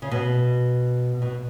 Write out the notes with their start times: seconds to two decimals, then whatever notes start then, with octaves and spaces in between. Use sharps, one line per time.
0.02 C#3
0.11 B2
1.22 B2